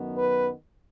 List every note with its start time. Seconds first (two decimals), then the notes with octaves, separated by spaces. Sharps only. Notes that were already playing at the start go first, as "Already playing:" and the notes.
Already playing: F#2 D#3 F#3 B3
0.17 B4